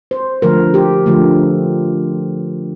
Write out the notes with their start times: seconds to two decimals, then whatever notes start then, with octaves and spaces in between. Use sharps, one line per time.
0.11 C5
0.42 D3 F3 A3 A#4
0.74 G4
1.06 D3 F3 A3